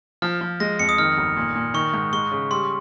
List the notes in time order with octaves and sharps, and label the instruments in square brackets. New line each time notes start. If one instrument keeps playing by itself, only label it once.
[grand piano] F3 [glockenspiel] F6
[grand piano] F3
[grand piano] G#3 [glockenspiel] A#6
[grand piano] F2 [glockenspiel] C#7
[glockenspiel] D#6
[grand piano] D#3 [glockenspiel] F6
[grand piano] G1
A#2
A#2
[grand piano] D#3 [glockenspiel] C#6
[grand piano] G#2
[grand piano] G#3 [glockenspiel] C#6
[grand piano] C#3
[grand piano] G3 [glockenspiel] C6